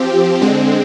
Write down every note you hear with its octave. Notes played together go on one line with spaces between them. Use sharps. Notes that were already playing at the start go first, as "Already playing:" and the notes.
Already playing: F3 C4 G4
D3 G#3 C4